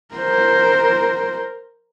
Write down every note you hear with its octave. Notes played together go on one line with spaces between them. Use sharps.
A#4 C5